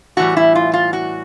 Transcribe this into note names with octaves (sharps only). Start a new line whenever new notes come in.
A2 E3 G3 F#4
E4
F4
F4
F#4